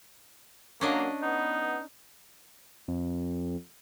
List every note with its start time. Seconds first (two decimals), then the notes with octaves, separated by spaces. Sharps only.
0.81 F#3 A#3 C#4 D4 D#5
1.22 B3 D#4
2.88 F2